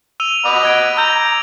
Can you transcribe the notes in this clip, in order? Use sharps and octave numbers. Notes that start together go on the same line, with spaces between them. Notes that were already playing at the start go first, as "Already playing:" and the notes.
E6 D#7 F7
D#5 F#5 B5 D6
E6 G#6 D7
A#5 E6 G6 F7